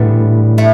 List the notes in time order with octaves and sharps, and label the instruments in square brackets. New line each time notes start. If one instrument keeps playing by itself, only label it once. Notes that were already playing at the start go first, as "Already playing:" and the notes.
Already playing: [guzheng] E2 D3 G3 B3 D4 [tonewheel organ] A2
[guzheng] A3 E4